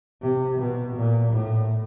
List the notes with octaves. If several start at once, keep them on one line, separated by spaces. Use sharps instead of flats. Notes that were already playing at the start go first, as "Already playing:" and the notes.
C3
B2
A#2
A2